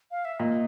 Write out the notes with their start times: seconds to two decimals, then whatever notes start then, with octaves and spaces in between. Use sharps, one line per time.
0.11 F5
0.25 E5
0.40 A#2 D#5